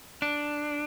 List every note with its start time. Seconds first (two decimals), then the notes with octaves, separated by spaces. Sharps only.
0.22 D4